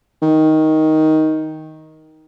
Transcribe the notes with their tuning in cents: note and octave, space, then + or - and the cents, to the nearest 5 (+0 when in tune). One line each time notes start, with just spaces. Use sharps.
D#3 +10